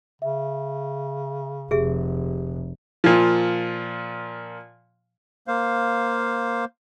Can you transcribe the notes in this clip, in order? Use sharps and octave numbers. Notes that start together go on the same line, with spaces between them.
C#3 E5
F1 G4 G#4 E5
A#2 F3
A#3 C5 F5